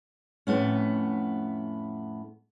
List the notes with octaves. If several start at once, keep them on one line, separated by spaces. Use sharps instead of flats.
F2 A2 A3 B3 C#4